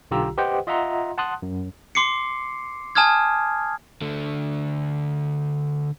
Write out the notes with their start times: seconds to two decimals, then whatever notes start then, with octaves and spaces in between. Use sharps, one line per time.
0.11 B1 D3 F4 G4 A#5 E6
0.38 G4 B4 C5 D#5 F#5 G5
0.67 F4 D#5 E5 F#5 A#5 C6
1.18 F#5 A5 C6 D#6 F#6
1.42 F#2
1.95 C6 D6 C7 C#7
2.95 G#5 A5 D#6 F6 G#6
4.01 D3 A3